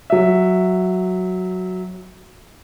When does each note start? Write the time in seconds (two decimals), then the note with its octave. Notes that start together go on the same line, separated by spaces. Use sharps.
0.10 F#3 E5